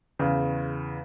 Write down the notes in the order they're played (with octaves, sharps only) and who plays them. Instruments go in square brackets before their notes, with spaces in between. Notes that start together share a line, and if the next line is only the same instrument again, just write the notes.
[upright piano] E2 C#3